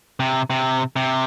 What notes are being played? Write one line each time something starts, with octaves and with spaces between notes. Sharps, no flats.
C3
C3
C3